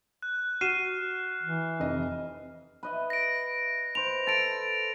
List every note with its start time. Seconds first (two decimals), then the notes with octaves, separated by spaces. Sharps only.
0.22 F#6
0.61 F#4 F6 C7 D#7 E7
1.43 E3
1.80 F1 D#5
2.83 B4 D#5 E5
3.10 A#6 D7
3.95 B4 C5 F7
4.27 A4 A6 D7